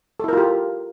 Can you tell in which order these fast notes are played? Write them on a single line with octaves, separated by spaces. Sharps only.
A4 E4 A#4 F4 G4